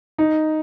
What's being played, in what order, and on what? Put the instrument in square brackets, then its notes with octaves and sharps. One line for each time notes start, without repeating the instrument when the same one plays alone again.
[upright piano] D#4